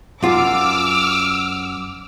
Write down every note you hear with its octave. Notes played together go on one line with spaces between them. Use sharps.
F#2 F4 D6 E6 F6